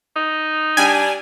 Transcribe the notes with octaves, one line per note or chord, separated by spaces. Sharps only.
D#4
G3 D4 G#5